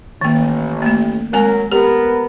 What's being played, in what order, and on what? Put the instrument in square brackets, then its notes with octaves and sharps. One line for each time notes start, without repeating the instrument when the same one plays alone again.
[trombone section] A1 [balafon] D#3 A#3
[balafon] A3 A#3
[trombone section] F#3 A#4 [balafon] G#3 C4 G#5
[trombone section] B3 A#4 [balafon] G4